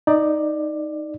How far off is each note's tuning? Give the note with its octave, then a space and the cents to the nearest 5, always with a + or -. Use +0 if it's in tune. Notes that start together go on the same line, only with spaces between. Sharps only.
D#4 +0 D5 +15